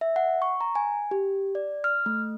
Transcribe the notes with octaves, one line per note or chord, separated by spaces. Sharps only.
E5
F#5
C#6
A#5
G#5
G4
D5
F6
A3